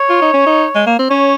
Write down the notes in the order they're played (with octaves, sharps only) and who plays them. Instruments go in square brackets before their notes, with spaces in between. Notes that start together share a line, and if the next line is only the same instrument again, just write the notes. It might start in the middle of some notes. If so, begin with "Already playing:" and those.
Already playing: [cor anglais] C#5
[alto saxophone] F4
D#4
C#4
D#4
G#3
A#3
C4
[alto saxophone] C#4 [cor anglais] C#5